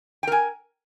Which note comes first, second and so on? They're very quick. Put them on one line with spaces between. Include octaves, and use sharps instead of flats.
G5 A#4 G#5